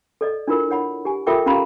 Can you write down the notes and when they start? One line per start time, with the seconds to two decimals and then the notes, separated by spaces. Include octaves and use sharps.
0.21 A4 D5 D#5
0.48 D4 E4 F4 A#4
0.70 C#5 F#5 B5
1.05 G4 G#5
1.27 F4 A4 A#4 E5 G5 D6
1.46 C#4 F4 G4 F5 A#5 B5